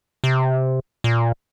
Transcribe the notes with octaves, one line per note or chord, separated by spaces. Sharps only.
C3
A#2